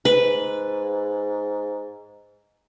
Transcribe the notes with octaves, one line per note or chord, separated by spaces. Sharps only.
G#2 B4